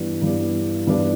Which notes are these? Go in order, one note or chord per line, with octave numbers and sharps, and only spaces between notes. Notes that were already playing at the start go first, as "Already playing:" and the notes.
Already playing: G2 E3 B3 D4 G4
G2 E3 B3 D4 G4
G2 E3 B3 D4 G4